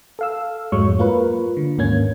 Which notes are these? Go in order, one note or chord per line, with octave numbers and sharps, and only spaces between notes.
A4 F5 E6
F2 G#2 F#3 G#3 C#5 C#6
A#3 F4 A#4 B4
D3
D#2 G#2 A#3 C#4 G#6